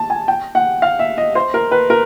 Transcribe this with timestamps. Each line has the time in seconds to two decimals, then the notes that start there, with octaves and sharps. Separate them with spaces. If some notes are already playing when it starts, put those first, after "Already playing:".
Already playing: A5
0.10 G#5
0.28 G5
0.55 F#5
0.82 F5
0.99 E5
1.18 D#5
1.35 C5
1.54 A#4
1.72 B4
1.90 A#4